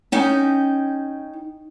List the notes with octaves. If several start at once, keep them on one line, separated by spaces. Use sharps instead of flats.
C#4 D#4 G5